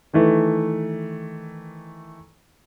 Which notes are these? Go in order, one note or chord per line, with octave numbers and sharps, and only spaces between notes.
D#3 E3 A3